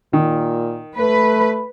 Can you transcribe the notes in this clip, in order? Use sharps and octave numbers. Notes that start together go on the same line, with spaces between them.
A#2 D#3
A3 B4